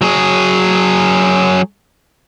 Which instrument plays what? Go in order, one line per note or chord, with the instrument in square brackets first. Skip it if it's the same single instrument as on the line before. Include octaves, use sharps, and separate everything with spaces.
[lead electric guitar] F#3 G#4